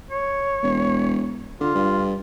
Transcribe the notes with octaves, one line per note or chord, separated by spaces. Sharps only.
C#5
E1
D3 F4
G2